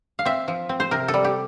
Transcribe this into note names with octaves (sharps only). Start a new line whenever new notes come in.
F5
C4 E5
F3
C4
C5
C3 A#4
A4
G3
G4